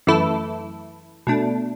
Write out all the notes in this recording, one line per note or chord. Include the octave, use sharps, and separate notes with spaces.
F#2 E3 A3 E4 A4
B2 A3 D4